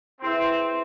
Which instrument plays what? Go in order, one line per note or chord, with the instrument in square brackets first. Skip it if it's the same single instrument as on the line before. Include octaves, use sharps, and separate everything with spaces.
[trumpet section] C4 [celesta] E4 G#4 B4 E5